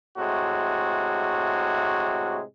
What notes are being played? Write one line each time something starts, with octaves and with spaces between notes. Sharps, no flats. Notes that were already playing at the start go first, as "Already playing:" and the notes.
A2 C3 G#3 F#4